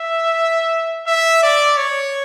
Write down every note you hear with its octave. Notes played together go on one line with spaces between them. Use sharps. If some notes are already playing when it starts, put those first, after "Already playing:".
Already playing: E5
E5
D5
C#5